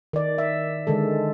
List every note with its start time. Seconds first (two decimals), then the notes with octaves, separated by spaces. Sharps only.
0.13 D#3 D5
0.38 E5
0.87 D3 D#3 G#3 A4